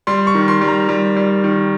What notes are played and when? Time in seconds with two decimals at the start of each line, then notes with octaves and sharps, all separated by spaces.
0.07 G3 C6
0.27 C#6
0.35 D#3
0.48 C6
0.61 G3
0.68 A#5
0.89 G3
1.17 G3
1.44 D#3